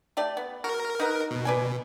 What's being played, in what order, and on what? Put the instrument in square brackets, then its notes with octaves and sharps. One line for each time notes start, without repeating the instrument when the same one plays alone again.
[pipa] A3 G4 D5
B3
[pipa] F#4 [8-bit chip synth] A#4
[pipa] D#4 B4 F#5
[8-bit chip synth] B2
[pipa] B4 D5 G#5